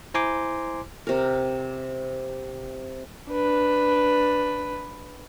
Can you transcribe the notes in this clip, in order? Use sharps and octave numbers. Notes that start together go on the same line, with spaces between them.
E4 C5 G#5 A#5 C6 D6
C3 A#4
D4 B4